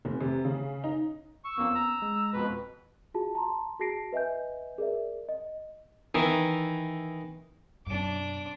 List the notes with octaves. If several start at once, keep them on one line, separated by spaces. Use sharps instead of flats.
F1
C3
C#3
D#4
C#6 E6
F2 A#3 B3 C#4
A#5
G#3
F2 B2 B4
F4 F#4 G#4 A5
A5 A#5 C6
F#4 G#4 A5 A#6 C7 D7
B4 D#5 E5 G#5 G6
G#4 A#4 D5 E5
D#5
D#3 E3
F#2 B2 D4 D6